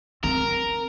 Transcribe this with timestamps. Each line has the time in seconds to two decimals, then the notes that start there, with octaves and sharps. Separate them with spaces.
0.24 C4 A#4